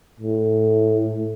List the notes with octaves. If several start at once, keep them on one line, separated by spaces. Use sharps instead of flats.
A2